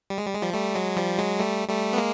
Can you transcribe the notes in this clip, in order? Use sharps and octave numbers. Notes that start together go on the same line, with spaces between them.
G3
G#3
G3
G#3
F3 G3
G3 A3
F#3 G#3
F3 G3
F#3 G#3
G3 A3
G3 A3
B3
G#3 A#3